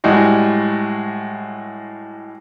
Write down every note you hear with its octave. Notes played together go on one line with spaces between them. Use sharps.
A2 G3 G#3 F#4